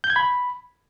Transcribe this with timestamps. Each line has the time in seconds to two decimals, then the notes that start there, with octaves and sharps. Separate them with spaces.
0.04 G6
0.10 G#6
0.16 B5